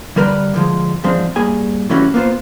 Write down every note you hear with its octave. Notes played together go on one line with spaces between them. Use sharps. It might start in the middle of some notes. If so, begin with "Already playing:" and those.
D3 G3 A#4 B4 D5
D3 F3 G#3
E2 G#2 F3 G#3 C4 D4
G2 A#3 G#4 G#5
C3 E3 A3 C#4 F#4
A#3 B3 F4 C5